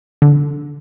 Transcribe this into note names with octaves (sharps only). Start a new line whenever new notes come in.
D3